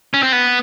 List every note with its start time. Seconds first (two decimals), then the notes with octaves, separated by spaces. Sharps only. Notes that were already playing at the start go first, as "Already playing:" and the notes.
0.14 C#4
0.23 C4
0.32 B3